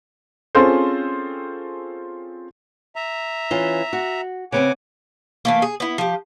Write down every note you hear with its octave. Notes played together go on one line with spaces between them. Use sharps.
C4 C#4 F4 G#4 A4 C5
E5 A#5
E3 C#4 F4
F#4
C#3 B3 C4 F#5 G#5 D6
E3 A3 A#3
G#4
B3 E4
F3 G4